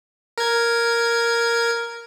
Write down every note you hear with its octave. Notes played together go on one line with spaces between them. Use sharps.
A#4 G#6